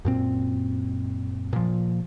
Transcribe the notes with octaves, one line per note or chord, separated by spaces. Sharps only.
F#2 A#2 C4
A#2 F3